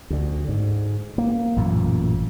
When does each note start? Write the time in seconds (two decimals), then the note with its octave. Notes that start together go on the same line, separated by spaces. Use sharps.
0.10 D2 D3
0.49 G#2
1.18 A#3
1.56 A1 F#2 A#2